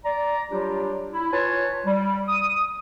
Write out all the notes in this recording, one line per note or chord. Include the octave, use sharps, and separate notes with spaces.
D5 A#5
F#3 G3 D4 F4 G4
E4
F4 B4 C#5 G#5 A5 C6
G3
D#6